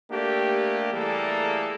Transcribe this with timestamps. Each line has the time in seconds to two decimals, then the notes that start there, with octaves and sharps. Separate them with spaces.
0.11 A3 A#3 D4 G4
0.94 E3 G3 A3 A#3 G#4 A4